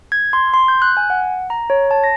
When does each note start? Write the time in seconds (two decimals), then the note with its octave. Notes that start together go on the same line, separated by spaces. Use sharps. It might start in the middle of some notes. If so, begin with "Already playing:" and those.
0.12 G#6
0.33 C6
0.54 C6
0.68 G6
0.82 F#6
0.97 G#5
1.10 F#5
1.50 A#5
1.70 C#5
1.91 A5
2.04 A#6